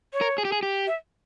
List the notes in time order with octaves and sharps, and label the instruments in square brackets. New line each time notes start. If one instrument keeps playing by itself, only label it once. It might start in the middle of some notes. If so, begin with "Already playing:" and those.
[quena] C#5
[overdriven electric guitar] A#4
G#4
G4
G#4
G4
[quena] E5